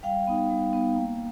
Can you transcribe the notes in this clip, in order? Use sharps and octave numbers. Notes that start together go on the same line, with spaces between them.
G3 F5 G5
B3 D#4
G3
B3 D#4
A#3